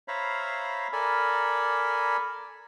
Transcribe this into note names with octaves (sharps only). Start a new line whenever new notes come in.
C5 C#5 E5 F5 A#5 B5
A4 A#4 D5 G#5 B5